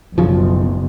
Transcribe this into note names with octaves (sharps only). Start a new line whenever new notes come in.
F#1 B1 C#3 F3